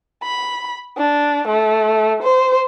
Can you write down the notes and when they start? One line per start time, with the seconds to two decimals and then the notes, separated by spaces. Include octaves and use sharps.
0.23 B5
0.98 D4
1.48 A3
2.23 C5